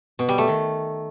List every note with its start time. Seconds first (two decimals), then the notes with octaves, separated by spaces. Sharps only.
0.19 B2
0.29 G3
0.38 A3
0.48 D#3